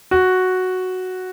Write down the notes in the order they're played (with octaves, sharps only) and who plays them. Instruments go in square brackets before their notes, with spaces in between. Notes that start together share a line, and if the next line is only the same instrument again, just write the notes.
[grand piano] F#4